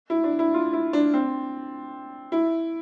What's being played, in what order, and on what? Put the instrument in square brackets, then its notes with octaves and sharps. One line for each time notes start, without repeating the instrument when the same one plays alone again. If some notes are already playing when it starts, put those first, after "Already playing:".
[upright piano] E4
D4
E4
F4
E4
D4
C4
E4